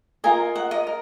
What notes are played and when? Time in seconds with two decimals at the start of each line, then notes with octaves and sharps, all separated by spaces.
0.24 F4 A#4 D#5 G#5
0.56 F#5
0.71 D#5
0.87 A#4